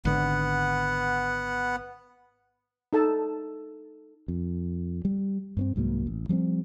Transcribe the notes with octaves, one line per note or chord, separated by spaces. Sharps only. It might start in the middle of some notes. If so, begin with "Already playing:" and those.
G#1 D3 B3 F#5
D#4 A4 A5
F2
G3
G2 B3 C4
C2 G#2 F#3 A#3
A1
F3 G3 B3 C4